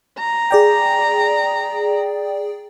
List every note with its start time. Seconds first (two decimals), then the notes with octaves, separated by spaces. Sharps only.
0.19 A#5
0.51 G#4 D5 G5